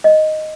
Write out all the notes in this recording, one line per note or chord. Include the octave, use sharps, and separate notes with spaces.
D#5